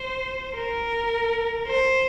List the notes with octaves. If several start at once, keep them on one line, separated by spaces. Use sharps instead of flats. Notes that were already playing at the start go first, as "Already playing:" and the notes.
Already playing: C5
A#4
C5